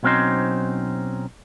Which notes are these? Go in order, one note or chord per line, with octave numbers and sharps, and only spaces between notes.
B1 F#3 C4 C#4 D#4 C5